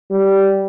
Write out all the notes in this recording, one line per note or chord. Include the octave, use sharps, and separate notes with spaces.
G3